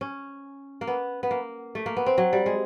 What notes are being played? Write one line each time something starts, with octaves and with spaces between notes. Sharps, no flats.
C#4
A#3
B3
B3
A#3
A3
A#3
B3
C4
F#3
G3
G#3